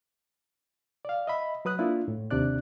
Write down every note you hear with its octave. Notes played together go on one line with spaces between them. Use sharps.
D5 F5
D#5 E5 B5
F#3 B4 D#6 F#6
A#3 D4 E4 F4
A2
D#2 C3 D4 D5 F#6